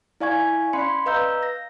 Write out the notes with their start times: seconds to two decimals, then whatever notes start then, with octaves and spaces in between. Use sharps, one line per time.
0.20 E4 D5 F5 G#5 C#6 G#6
0.73 C#4 D5 F5 B5 C6 C#7
1.06 B4 D#5 F5 A#5 E6 G6
1.43 A#6